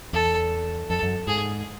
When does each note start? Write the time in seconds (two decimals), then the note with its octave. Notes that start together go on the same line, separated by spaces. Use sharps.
0.13 E2 A4
0.89 F2 A4
1.03 F#2
1.27 G#2 G#4